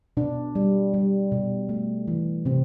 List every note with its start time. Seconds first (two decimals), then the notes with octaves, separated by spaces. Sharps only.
0.17 B2 D4
0.55 G3
0.94 G3
1.32 B2
1.69 A3
2.08 E3
2.45 C3 C4